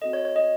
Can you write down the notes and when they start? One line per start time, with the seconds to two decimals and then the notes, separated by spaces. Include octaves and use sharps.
0.01 C4 F#4 A4 D#5
0.13 C#5
0.25 C#5
0.36 D#5